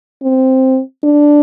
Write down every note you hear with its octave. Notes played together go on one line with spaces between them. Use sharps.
C4
D4